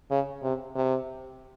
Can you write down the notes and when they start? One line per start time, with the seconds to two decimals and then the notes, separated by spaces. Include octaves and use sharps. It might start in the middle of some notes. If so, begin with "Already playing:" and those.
0.11 C#3
0.43 C3
0.75 C3